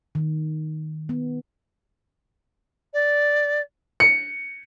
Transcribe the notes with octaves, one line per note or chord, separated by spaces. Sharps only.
D#3
B3
D5
C#7